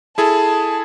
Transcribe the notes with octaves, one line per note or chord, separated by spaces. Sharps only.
E4 G#4 A4 A5